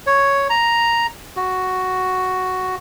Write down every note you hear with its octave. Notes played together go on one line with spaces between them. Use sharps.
C#5
A#5
F#4